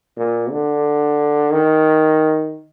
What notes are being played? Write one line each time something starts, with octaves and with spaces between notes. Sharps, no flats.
A#2
D3
D#3